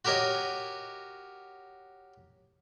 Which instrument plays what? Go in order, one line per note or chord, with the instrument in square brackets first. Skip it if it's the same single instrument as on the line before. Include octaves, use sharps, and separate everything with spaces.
[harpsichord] F#4 G4 A#4 C#5 D#5